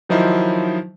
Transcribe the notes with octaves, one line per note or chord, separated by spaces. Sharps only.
D#3 F3 F#3 D#4 E4 C5